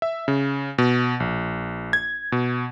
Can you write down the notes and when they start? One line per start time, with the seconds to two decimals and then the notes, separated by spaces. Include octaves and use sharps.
0.02 E5
0.28 C#3
0.78 B2
1.20 A#1
1.93 G#6
2.32 B2